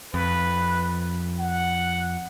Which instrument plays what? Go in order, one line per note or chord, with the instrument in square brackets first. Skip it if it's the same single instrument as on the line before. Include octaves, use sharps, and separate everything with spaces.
[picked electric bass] F2 [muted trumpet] B4
[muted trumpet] F#5